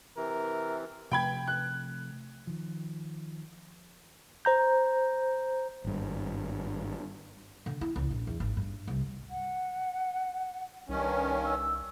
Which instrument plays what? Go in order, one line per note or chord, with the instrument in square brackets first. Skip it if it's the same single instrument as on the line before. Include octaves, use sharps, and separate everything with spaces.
[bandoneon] C3 E3 [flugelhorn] A#4
[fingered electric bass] C3 F3 A3 [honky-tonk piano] G5 B5 G#6
[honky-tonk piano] F#6
[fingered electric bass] D#3 F3
[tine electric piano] C5 A#5 G6
[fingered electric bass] G#1 G2
[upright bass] D3
E4
C#2
A#1
E2
G#1
G2
C2
[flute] F#5
[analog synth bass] C2 [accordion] G2 D#3 C#4
[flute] E6